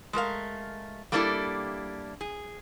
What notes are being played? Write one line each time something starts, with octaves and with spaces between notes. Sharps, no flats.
G#3 A3 A#4 F5
G3 A3 A#3 D4 E4 A4
G#4